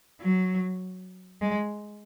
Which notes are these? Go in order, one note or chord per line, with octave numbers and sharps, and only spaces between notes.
F#3
G#3